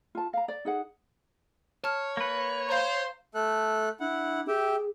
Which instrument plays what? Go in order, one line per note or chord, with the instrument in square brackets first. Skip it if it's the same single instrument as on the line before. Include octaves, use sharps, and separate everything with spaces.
[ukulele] F4 A5
F5 A#5
D5
D#4 G#4 F#5
[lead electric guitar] C#5 [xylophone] A5 F6
[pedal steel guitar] A#3 B4
[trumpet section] C5 [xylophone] F5 A#5
[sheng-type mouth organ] A3 A4 F#6
[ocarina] D4 [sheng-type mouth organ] E4 F#5
[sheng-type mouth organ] G4 E5 G5 [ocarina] G#4